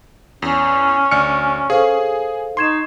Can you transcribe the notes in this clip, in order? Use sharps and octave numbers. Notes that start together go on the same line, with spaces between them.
E2 C#4
D2 D5 F6 C#7
G#4 A4 C5 F5
D#4 C6 C#6 G#6 E7